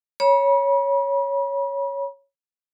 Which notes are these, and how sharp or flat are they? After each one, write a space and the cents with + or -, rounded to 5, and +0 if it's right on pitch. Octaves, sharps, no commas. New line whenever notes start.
C#5 +0 B5 -40